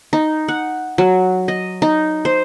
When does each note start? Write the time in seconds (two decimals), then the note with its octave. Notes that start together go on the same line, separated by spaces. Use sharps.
0.13 D#4
0.48 F#5
0.98 F#3
1.48 D#5
1.82 D#4
2.25 C5